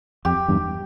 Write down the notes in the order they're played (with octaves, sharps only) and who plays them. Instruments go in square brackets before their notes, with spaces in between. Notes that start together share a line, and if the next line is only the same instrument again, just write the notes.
[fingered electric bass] F2 [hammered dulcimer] G4
[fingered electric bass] E2 G2